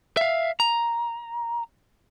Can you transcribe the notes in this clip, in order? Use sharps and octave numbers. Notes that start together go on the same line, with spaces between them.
E5 F5
A#5